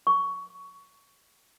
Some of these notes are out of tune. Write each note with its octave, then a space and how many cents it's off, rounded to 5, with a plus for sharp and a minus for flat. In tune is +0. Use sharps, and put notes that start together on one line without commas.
C#6 +15